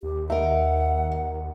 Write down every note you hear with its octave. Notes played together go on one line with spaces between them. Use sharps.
D#2 G4
D#4 A#4 E5 F#5